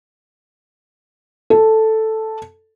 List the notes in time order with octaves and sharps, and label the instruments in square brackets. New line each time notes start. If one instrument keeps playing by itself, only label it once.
[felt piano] A4